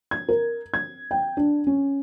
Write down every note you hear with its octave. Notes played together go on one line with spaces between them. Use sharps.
G#6
A#4
G#6
G5
D4
C#4